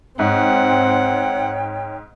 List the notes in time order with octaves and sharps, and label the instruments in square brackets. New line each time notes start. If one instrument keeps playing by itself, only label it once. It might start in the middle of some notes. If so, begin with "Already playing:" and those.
[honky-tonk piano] G#2 [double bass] C4 [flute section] C#5 G5 [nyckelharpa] F#5